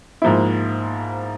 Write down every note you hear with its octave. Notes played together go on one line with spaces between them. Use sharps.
G#2 F3 A#3 E4